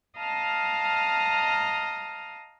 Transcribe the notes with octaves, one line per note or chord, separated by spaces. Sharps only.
D#5 F5 A5 A#5 D#6 F6